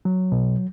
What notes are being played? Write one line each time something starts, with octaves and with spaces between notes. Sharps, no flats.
F#3
B2